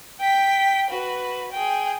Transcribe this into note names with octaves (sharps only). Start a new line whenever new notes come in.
G5 B6
F#4 B4
G#4 G5